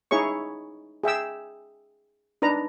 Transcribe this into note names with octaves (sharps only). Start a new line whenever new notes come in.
D#4 E4 G#4 C#5 C#6
G#4 E5 G5 E6
D4 D#4 B4 A#5